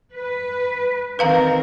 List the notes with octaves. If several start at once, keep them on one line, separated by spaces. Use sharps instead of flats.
B4
D#3 C4 A#4 B4 F5 A#5